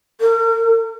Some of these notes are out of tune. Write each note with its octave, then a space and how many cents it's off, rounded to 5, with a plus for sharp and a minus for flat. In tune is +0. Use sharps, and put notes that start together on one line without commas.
A#4 -40